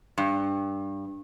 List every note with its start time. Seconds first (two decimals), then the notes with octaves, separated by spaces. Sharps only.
0.18 G2